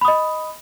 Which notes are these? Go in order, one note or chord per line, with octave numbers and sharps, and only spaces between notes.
D#5 B5 D#6